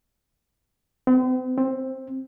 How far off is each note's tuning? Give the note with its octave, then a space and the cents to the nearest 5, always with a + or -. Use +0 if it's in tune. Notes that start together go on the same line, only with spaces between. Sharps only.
C4 -40
C4 +15